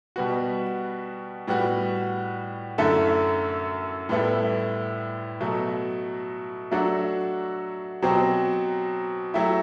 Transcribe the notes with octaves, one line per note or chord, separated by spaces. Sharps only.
B2 G3 B3 F#4
A2 G3 B3 F#4
F#2 D3 A3 E4 A4
A2 G3 B3 E4 A4
B2 F#3 A3
F#3 A3 D4 F#4 A4
B2 F#3 C4 G4
F#3 A3 E4 G4